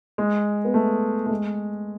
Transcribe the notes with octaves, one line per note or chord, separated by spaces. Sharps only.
G#3
B3
A3
A3
G#3